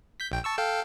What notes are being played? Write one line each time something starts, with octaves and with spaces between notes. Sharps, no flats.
G6 B6
A#1 G5
A5 C#6 E6
A4 F5 G5